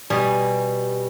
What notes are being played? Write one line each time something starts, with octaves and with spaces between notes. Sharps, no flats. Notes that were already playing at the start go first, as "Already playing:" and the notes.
B2 G3 G#5